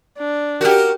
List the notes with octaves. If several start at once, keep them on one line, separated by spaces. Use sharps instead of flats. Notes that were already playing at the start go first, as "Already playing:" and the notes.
D4
F#4 G4 A#4